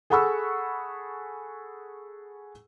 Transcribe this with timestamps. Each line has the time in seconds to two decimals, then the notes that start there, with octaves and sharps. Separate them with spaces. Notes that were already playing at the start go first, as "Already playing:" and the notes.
0.10 G#4 A4 F#5 B5 C#6 E6